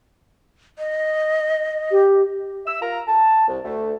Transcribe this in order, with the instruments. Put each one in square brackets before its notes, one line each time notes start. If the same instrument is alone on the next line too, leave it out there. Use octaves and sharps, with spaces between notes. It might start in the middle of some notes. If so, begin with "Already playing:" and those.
[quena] D#5
[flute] G4
[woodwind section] E5 E6
F4 A#4 A#5
A5
C2
D2 A3